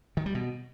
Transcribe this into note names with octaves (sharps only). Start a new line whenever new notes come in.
D#3
G3
B2